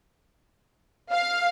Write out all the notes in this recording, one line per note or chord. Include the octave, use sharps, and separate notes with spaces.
F5